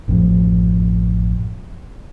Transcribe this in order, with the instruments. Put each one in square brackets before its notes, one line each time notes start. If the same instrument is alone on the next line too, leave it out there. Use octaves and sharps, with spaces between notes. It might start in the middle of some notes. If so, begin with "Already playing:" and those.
[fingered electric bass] A1 F#2 A2 F3